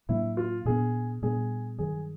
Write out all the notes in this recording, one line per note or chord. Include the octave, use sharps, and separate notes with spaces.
A2 F#3 A#3 D4 E4
F4
A#2 G3 B3 D4 G#4
A#2 G3 B3 D4 G#4
G2 D#3 F#3 G#4